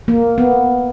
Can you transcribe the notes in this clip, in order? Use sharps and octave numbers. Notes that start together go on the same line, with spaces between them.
A#3
B3